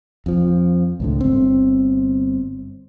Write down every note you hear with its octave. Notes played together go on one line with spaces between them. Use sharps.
F2 F3
C#2 A2 D3
G1 C4